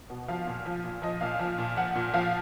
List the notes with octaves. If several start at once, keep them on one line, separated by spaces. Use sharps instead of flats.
B2
F3 F5
A#2
F3
A#2
F3 D#5
A#2 F5
F3
A#2
F3 F#5
A#2
F3 F5